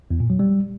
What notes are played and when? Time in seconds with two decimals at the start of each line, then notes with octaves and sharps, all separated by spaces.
0.11 E2
0.20 A#2
0.30 F#3
0.39 G3